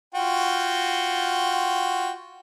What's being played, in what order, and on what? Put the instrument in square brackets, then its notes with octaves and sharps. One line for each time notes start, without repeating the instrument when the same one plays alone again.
[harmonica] F4 F#4 G5